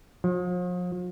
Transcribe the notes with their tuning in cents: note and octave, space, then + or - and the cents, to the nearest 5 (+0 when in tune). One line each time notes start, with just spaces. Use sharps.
F3 +40